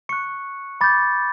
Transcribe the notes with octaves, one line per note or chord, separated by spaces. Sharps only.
C#6 F#6 C#7
B5 D6 G6 A6